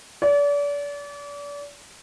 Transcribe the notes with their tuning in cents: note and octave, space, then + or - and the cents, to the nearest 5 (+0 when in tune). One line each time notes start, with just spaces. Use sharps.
D5 -35